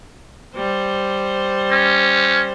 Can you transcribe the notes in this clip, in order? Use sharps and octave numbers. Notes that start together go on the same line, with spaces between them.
G3 C5
C#4